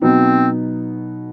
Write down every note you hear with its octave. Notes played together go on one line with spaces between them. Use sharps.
B2 F#3 B3 C4 D#4